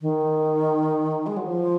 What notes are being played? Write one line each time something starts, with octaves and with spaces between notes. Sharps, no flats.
D#3
G#3
F#3
F3